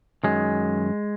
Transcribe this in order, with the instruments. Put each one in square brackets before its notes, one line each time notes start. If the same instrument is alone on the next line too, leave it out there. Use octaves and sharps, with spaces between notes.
[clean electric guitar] F#2 D#3 F#3 G#3